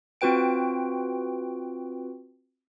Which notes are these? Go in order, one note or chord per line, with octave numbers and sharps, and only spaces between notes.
C4 F4 F#4 B4 G5 D7